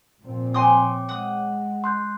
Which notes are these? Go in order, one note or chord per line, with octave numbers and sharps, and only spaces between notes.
A#2 F3 C4
C#5 G5 G#5 C6 D6 D#6
G#3 F#5 D#6
C6 F#6 G6